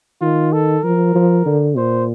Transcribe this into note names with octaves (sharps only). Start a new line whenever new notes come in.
D#3 F4
A4
F3 A#4
F3
D3
A#2 C5